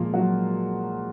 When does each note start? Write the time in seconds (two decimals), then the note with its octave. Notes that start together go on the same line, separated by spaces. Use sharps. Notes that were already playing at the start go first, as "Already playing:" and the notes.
Already playing: A#2 F3 G#3 A#3 F4
0.14 F#3 F#4